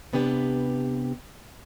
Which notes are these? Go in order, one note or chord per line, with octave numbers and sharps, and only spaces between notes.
C3 B3 D4 G4 A4 B4